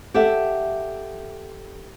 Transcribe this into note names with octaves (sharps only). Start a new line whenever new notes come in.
G4 A4 E5 F#5